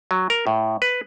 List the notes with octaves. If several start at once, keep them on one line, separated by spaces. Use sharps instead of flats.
F#3
A#4
A2
B4